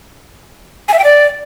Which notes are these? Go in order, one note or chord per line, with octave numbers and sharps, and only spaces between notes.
G#5
E5
G5
D5